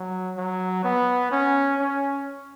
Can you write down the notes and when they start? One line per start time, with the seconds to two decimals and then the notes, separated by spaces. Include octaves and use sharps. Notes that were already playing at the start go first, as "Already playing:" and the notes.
Already playing: F#3
0.37 F#3
0.84 B3
1.32 C#4
1.80 C#4